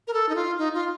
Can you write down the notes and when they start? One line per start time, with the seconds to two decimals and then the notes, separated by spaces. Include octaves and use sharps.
0.07 A#4
0.13 A4
0.29 D#4
0.36 F4
0.58 D#4
0.74 F4